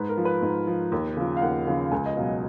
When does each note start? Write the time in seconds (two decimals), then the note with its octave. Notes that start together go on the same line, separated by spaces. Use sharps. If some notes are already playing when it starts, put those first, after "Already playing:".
Already playing: G#2 B4
0.09 A#4
0.17 F3
0.25 B4
0.42 G#2
0.67 F3
0.92 D#2
1.17 C#3 F3
1.37 F5
1.42 D#2 F#5
1.67 C#3 F3
1.92 C#2 G#5
2.06 D#5
2.16 B2 F#3 F5